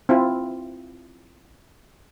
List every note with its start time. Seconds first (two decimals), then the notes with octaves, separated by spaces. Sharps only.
0.09 C4 E4 F4